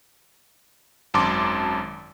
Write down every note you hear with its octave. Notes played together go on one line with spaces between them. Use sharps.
G#1 F#2 A5 C6 D6